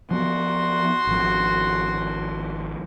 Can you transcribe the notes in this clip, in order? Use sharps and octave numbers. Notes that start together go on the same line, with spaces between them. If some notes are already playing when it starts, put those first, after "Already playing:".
F3 B3 F#4 C6
G#1 F3